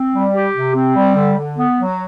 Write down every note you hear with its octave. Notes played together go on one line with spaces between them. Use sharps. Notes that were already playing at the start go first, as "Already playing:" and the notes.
Already playing: C4
G3
G4
C3
C4
G3
D3
D3
B3
F#3